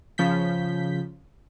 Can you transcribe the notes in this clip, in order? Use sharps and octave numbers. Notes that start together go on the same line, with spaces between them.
C#3 F3 G6 B6